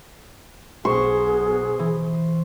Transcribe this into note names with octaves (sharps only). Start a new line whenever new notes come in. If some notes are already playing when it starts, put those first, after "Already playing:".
B1 G#4 C5 C#6
E3